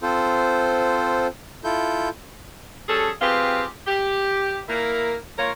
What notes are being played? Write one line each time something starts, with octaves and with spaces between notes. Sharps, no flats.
C4 F4 A4 C5
E4 F4 A4 G6
G3 C#4 G#4 A4
C4 F4 G4 G#4 B4
G4
A#3 E4 A#4
A#3 F4 A#4 C#5